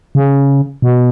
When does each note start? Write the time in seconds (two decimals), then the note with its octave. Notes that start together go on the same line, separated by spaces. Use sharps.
0.15 C#3
0.82 B2